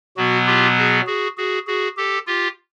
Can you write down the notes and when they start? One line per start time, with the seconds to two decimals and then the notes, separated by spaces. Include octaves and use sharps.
0.17 B2 F#3 B3 F#4
0.47 F4 G4
0.78 F#4 G#4
1.07 F#4 G#4
1.37 F#4 G#4
1.67 F#4 G#4
1.97 G4 A4
2.27 F4 G4